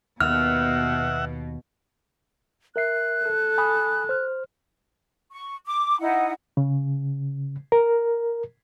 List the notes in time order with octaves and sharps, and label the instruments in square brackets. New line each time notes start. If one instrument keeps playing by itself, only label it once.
[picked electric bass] D#2 [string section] B2 [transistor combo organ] E5 F#5 [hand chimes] F6
[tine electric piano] A#4 E5 C7 [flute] F#6
[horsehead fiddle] A4
[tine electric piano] G#5 B5 D#6
C5 F6
[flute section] C#6
D6
D#4 E4 F#5
[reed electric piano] C#3
A#4